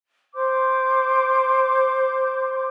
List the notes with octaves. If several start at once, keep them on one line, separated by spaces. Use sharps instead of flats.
C5 C6 D6 G6